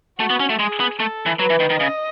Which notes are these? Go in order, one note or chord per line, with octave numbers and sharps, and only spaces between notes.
A3 F#4
B3
C#4
A3
G#3 G#4
B3
A3 A4
E3
F#3 B4
E3
D#3
D#3
C#3 D#5